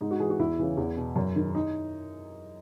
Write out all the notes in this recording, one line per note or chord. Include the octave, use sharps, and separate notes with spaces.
G#2 D#4
F#4
E3 G#4
F#4
E2 E4
C#3 E3
E2
B2
F#2
D#3
D#4